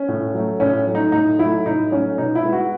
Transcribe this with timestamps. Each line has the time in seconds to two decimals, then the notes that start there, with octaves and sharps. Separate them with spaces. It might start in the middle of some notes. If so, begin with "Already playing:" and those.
Already playing: C#4
0.08 A2
0.34 F#3 A3
0.60 A2 C#4
0.87 F#3 A3
0.95 D#4
1.12 A2 D#4
1.39 F#3 A3 E4
1.66 A2 D#4
1.91 F#3 A3 C#4
2.18 B2 D#4
2.35 E4
2.44 G#3 B3
2.53 F#4